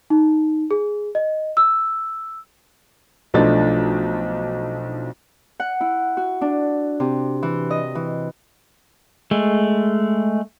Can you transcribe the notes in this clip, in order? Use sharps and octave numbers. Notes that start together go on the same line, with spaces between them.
D#4
G#4
D#5
E6
B1 F3 A3 D4 D#4 A6
F#5
E4
F#4
D4
C3
E3
D#5
E3
G#3 A3